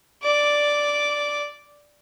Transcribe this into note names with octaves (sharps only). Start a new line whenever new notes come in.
D5 D6